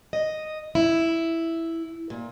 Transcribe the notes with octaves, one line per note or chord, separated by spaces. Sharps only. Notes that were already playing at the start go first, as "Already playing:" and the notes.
D#5
E4
A#2